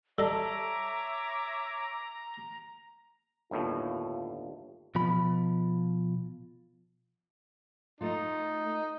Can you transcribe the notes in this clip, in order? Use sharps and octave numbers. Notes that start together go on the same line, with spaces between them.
G3 A4 C#5 D#5 E5 A#5 D6
G1 D#2 A2 F4
B2 F3 B5
A3 D#4 F4